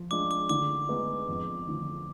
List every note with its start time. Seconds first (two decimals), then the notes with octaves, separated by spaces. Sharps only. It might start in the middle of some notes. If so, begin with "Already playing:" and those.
Already playing: F3
0.11 G#3 D4 F4 D6
0.31 D6
0.49 D3 D6
0.89 G#3 B3 D#4
1.28 F2
1.67 D3 F3